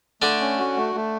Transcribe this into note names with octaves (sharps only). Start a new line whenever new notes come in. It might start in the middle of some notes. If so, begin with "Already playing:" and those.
D3 A3 D4
C#4
F#4
A3
A3